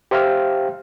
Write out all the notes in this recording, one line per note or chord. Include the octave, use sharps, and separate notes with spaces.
G4 C5 E5 F5 G5 F6